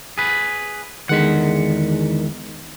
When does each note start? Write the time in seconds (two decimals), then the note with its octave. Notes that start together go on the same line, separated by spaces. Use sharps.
0.18 G#4 B4
1.09 E2 D3 D#3 G#3 F#5 B6